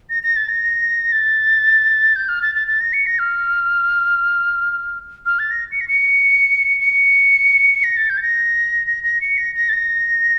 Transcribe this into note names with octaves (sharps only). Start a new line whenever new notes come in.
A#6
A#6
A6
A#6
A6
G6
F6
A6
A6
A6
A#6
C#7
A#6
F6
F6
A6
A#6
C#7
A#6
C#7
C#7
A#6
A6
G6
A6
A#6
A#6
A#6
C#7
A#6
A#6
A6
A#6